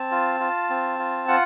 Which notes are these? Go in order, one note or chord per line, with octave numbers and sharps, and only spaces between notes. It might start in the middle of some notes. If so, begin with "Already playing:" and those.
Already playing: C4 A5
F4
F4
C4
F4
F4 F#5